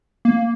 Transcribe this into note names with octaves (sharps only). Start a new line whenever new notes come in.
A#3